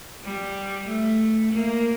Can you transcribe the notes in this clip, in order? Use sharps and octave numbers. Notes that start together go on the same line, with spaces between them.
G3
A3
A#3